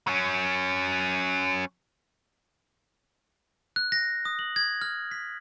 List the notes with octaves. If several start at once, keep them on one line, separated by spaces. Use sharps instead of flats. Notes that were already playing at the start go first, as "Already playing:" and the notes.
F#3 C#4
F#6
A#6
D#6
F#7
G#6
F6
B6